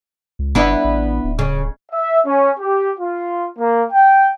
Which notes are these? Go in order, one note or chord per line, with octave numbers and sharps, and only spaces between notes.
C#2
F#1 B3 D4 E4
A1
D1
C#3
E5
C#4
G4
F4
A#3
G5